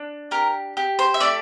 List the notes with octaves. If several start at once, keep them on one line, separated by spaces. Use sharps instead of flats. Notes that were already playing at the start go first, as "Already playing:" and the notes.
Already playing: D4
G4 A#4
G4
C5
E5
A3 D5